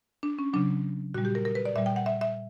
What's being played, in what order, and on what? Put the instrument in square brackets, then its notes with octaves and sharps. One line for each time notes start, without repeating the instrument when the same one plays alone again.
[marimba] D4
C#4
C#3 F#3 D4
A#2 G3 F#4
G4
A#4
A#4
B4
D5
A#2 G3 E5
G5
F#5
E5
E5